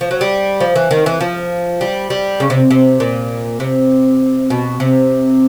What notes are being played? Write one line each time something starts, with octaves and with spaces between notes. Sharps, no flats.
F3
F#3
G3
F3
E3
D#3
E3
F3
G3
G3
C#3
C3
C3
A#2
C3
B2
C3